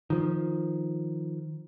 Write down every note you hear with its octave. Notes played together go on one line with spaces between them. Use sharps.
D#3 F3